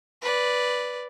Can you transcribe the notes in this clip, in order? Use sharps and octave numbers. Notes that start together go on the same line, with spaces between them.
B4 D5